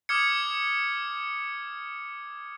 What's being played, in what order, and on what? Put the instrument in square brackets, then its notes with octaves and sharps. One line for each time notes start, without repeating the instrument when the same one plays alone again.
[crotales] D6 D#6 F6 G#6 C#7